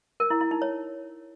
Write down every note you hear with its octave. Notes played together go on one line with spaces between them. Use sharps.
A#4
E4
E4
D#4
C#5